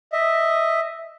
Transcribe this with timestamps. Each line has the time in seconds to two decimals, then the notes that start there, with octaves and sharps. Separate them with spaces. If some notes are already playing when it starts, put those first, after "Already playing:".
0.12 D#5 E5